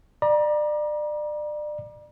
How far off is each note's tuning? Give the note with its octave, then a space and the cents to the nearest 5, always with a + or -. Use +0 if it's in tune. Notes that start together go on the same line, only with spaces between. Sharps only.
D5 +30 A#5 +35